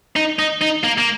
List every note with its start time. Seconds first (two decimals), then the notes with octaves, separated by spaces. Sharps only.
0.16 D#4
0.39 D#4
0.62 D#4
0.84 A#3
0.98 A#3